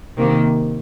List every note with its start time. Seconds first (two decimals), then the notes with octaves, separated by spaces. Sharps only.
0.17 C3 D#3 A#3